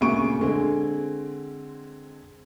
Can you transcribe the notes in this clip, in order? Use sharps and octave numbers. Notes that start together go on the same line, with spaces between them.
D2 A#2 C#3 G#3 C#6 D7
D3 G#3 C4